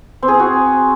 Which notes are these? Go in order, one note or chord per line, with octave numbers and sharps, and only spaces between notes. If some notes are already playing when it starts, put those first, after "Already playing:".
C4
G#4
C4
F#4